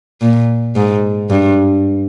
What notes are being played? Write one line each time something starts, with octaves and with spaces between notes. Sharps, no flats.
A#2
G#2
G2